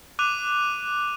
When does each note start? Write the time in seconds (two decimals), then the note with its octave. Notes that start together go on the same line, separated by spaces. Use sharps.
0.19 D6 F#6 D#7 F7